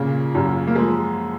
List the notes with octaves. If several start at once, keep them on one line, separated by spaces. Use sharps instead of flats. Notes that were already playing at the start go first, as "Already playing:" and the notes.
Already playing: A#2 C#3 A#3
F#2
A#3
F3 G#3